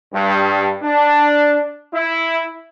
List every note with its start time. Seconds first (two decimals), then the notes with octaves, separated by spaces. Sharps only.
0.14 G2
0.83 D4
1.93 E4